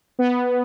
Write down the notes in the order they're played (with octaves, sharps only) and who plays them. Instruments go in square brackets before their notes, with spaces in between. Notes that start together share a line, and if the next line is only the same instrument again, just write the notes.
[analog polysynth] B3